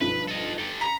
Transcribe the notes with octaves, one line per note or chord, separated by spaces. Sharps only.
B1 G2 F3 B4
A4 D#5
G4 A4
A#5 B5 B6